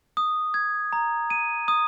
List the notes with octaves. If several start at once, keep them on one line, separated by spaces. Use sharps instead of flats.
D#6
G#6
A#5
D#7
D#6